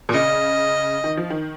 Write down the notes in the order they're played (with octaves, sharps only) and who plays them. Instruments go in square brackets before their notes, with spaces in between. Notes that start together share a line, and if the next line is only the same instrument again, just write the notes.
[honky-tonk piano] A#2
[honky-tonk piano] C#3 [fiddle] D#5
[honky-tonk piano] D#3
F3
D#3